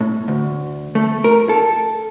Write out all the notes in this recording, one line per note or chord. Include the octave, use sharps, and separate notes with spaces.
A2
D2
A3
A#4
A4